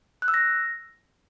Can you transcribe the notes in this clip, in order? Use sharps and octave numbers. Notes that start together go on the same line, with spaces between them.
F#6
E6
A#6